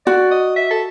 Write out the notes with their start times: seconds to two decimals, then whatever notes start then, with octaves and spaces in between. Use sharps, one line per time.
0.06 F#4 D5
0.31 D#5
0.56 E5
0.71 A4